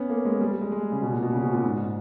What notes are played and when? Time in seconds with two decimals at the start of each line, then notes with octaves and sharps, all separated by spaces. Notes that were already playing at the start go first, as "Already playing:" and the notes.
Already playing: B3 C#4
0.10 A#3
0.25 G#3
0.41 G3
0.51 G3
0.61 G#3
0.72 G#3
0.92 C#3
1.02 B2
1.12 A#2
1.22 B2
1.33 C#3
1.42 B2
1.53 A#2
1.64 G#2